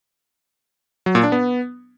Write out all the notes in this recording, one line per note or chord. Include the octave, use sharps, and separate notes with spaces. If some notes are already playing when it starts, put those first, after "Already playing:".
F#3
A#2
D4
B3